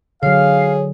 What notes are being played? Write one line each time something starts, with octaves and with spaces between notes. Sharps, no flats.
D3 F#3 G#4 C#5 F5